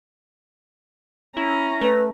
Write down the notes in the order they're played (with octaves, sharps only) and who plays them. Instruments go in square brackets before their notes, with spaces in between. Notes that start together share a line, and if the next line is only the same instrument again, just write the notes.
[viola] C#4 A#5 [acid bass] E4
[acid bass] A3 [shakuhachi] B4